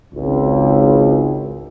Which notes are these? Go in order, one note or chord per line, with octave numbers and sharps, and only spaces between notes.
G#1 C#2